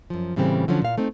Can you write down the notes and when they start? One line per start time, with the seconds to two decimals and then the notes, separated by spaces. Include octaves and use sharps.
0.10 F#2 F3
0.36 A2 C#3 E3 G3 A3 C4
0.68 D3 F3 F#3 C#4
0.82 A#2 F5
0.98 A3 C4 D#4